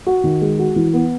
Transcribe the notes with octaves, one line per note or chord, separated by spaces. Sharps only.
F#4
D#3
G#3
F#4
E3
B3